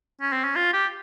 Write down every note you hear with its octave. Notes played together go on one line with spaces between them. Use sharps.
C#4
C4
C#4
F4
G4